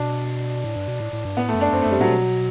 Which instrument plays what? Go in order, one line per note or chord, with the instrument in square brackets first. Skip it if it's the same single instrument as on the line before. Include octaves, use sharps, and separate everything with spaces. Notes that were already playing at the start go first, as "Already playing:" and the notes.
Already playing: [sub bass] B2 [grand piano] D4
[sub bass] A2
G2
B2
A2
A2
G2
[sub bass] A2 [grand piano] B3
[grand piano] A3
[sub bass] F#2
[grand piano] D4
[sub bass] F#2 [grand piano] C4
[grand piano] A3
[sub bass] F#2 [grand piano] G3
[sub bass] A2 [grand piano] F#3
[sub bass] B2